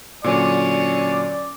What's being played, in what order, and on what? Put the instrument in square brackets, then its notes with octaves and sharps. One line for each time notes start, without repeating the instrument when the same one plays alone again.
[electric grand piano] A#2 D3 F#3 [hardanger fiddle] C#4 [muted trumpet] D5